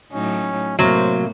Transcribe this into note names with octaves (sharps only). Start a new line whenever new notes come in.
A2 F#3 C#4 D#4
A2 C3 F#3 A#3 C5